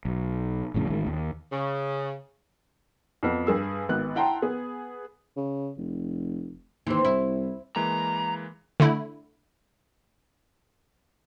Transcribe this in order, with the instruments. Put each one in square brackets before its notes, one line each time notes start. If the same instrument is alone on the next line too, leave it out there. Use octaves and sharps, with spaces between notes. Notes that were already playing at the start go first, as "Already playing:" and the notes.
[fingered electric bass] B1
G#1 F2 A2 C#3
A1 D#3 G#3
D#2
[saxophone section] C#3
[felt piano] F2 B3
G2 G#4 E6
G#1 B3 F#6
E4 F#5 G5 A5 A#5 C6
B3 G#4
[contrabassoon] C#3
F1
[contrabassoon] D#2 [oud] E3 C4
[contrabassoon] C2 [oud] E4
[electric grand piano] E3 G#3 A#3 [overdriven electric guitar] A#5
[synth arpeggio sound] D3 A3 E4